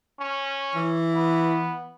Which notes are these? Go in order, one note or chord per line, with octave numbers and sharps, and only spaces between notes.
C#4
E3
B3